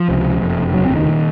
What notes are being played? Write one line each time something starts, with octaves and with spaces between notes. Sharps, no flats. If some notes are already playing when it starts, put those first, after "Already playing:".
Already playing: F3
C#2 C3
F#1 F2 C3
F1 D#2 C#3 F#3
C4
D#3
A#2